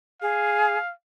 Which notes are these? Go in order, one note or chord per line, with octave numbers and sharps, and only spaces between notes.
G#4 F5